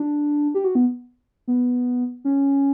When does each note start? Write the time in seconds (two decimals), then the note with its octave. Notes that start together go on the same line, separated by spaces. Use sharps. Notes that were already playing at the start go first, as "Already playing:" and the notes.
Already playing: D4
0.54 G4
0.64 F#4
0.75 B3
1.48 B3
2.25 C#4